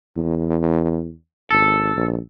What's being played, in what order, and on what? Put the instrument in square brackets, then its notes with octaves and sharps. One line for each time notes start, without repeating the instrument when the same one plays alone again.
[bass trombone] E2
[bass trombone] G#1 [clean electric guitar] A4
[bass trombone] A#1